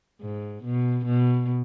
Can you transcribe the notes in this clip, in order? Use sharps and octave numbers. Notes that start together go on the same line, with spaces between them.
G#2
B2
B2